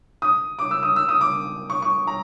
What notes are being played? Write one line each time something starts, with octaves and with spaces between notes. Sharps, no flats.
D#6
D6
E6
D#6
E6
D#6
D6
C#6
C#6
A#5